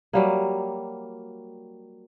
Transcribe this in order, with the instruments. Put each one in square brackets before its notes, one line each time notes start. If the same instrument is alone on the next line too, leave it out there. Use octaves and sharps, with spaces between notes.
[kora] F#3 G3 A#3